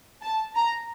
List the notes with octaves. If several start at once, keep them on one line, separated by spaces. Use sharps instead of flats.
A5
A#5